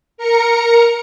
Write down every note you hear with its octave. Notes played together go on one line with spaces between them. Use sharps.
A#4 A#5 C#7